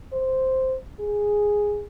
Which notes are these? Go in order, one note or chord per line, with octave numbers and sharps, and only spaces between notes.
C5
G#4